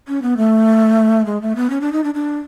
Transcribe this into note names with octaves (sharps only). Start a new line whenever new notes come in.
C#4
B3
A3
G#3
A3
B3
C#4
D4
D#4
D4
D4